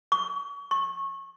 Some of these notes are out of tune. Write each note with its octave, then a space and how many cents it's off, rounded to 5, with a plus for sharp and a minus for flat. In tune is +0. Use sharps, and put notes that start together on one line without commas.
C#6 +35
C#6 -25